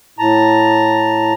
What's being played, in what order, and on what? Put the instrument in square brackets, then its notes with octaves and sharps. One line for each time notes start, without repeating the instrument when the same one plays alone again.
[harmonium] A2 A5 A#5